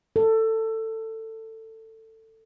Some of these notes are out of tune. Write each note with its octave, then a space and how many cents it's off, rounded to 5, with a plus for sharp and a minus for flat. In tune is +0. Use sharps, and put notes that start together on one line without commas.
A4 +20